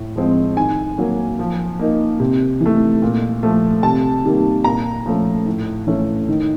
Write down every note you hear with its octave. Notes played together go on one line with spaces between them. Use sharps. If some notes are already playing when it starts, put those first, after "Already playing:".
Already playing: A2
F3 G#3 C4
D#3 G#5
F#3 A#3
F3
A#3 D#4
C3
E3
A3
A#2
F3 A3
C3 A5
D#3 G3 A#3
A#2 A#5
F3 A3 C#4
A2
E3 A3 C#4
D#3